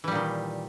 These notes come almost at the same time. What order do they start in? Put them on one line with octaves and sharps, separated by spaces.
E3 G3 A#2 D#3